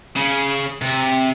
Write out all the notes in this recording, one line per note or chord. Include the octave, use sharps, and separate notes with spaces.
C#3
C3